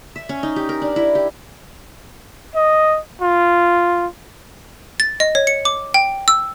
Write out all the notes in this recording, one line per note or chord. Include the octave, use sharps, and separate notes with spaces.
E5
C#4
D#4
G4
A#4
D4
E4
G4
D#5
F4
A6
D#5
C#5
C#7
D6
G5
E6